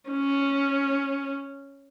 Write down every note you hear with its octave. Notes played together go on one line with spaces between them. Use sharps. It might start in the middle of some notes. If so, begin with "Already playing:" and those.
C#4